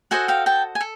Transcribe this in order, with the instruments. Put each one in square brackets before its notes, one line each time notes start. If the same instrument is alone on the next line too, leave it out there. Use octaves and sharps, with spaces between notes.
[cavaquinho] F#4 A4 C5 D#5 F#5 G#5
F5 G5
G5 A5
G#5
A4